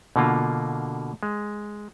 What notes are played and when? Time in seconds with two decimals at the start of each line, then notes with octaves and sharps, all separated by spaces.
0.16 B2 D3 A#3 F4
1.23 G#3